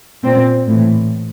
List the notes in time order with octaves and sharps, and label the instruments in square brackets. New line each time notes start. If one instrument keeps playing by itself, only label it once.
[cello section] A#2 C4
A2 E3